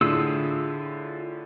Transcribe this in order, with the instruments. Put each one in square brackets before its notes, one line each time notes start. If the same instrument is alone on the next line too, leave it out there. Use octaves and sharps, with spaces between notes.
[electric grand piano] A2 D3 [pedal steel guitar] F4 G#4 E6